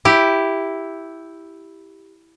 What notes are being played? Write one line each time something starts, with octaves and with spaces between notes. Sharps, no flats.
E4 G4